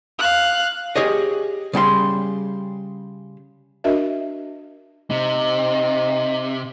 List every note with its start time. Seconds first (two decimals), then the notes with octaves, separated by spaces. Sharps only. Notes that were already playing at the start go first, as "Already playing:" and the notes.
0.19 F5 F#6
0.96 G4 G#4 C#5 D#5
1.73 C#3 G3 F#5 C6
3.84 D4 F#4 A#4 D#5 E5
5.10 C3 D#4